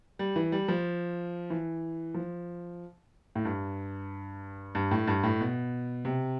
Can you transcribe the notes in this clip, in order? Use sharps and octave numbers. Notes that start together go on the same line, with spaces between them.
G3
E3
G3
F3
E3
F3
A2
G2
G2
A2
G2
A2
B2
C3